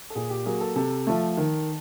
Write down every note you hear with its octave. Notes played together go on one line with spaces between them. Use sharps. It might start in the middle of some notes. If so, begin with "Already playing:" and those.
A4
A#2 G#4
G4
F#3 A#3 G#4
A4
C3 A4
F3 A3
D#3